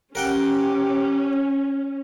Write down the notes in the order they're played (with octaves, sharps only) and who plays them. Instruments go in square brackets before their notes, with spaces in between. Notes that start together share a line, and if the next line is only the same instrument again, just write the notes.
[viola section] C#4 [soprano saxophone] G4 [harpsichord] A#4 F#5 G5